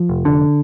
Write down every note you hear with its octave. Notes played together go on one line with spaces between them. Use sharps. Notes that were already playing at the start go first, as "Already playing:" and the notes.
Already playing: F3
F1
D3